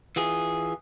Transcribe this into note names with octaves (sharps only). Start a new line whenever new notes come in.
E3 F4 G#4